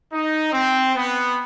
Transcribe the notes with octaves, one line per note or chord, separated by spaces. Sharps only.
D#4
C4
B3